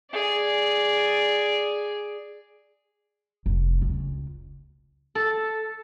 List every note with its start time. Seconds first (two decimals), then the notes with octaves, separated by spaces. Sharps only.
0.11 G#4 D5
3.46 F1
3.82 C#2
5.15 A4